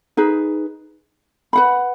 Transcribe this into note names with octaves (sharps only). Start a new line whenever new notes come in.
D#4 G#4 B4
B4 F#5 B5